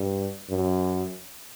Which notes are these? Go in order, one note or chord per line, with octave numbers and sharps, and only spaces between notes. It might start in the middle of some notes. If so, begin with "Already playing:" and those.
Already playing: G2
F#2